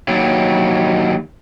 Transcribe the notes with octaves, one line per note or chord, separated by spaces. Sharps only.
D#2 F#3